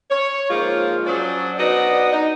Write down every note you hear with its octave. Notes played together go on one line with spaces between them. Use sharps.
C#5
G#2 F3 G#3 A#3 F4
F#3 C#4 D4 G#4 C5 D5
B3 D4 D#4 F#4 D5 D#5
D#4